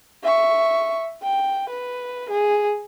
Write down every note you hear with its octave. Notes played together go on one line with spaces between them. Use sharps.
E5 C#6
G5
B4
G#4